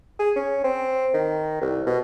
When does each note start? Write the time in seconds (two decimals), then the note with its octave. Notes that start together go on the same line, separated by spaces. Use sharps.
0.20 G#4
0.36 C#4
0.64 C4
1.14 D#3
1.61 C2
1.87 B2